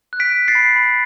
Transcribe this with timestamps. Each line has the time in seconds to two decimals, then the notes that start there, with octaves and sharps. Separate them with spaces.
0.13 F#6
0.20 B6 D7
0.34 F#6
0.48 A6 C7
0.55 B5
0.76 B5